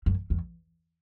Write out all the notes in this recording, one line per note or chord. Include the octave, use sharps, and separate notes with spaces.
F#2
E2